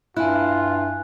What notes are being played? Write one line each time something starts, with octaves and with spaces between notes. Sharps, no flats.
G2 E4 F4 G#5 F#6